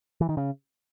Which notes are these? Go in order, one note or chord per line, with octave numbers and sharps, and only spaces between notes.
E3
D#3
C#3